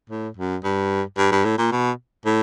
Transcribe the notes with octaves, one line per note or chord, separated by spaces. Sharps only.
A2
F#2
G2
G2
G2
A2
A#2
B2
A2